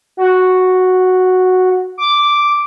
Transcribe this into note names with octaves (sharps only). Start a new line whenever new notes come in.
F#4
D6